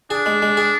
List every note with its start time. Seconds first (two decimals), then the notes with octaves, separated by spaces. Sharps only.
0.10 D4 G#4
0.26 G#3
0.42 G#3
0.57 G#4